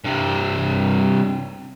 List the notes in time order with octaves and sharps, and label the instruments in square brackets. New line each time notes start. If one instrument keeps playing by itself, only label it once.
[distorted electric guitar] G2 C3